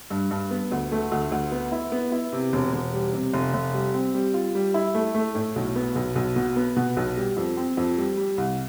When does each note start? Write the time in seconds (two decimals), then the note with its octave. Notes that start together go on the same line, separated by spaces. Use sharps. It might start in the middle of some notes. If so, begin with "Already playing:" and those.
0.10 G2
0.31 G2
0.51 B3
0.72 D2
0.92 A3
1.12 D2
1.32 D2
1.52 B3
1.72 E4
1.92 B3
2.12 E4
2.33 C3
2.53 E1
2.73 E1
2.93 G3
3.13 C3
3.34 F1
3.54 F1
3.74 G3
3.94 C4
4.14 G3
4.34 F4
4.55 G3
4.74 E4
4.95 A3
5.15 A3
5.35 A2
5.56 B1
5.76 B3
5.95 B1
6.16 B1
6.36 B2
6.56 B3
6.76 B2
6.97 B1
7.17 G3
7.37 F2
7.57 C4
7.77 F2
7.98 G3
8.17 G3
8.38 C2